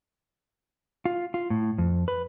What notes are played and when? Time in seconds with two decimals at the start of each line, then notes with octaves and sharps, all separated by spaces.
1.06 F4
1.34 F4
1.50 A2
1.78 F2
2.08 B4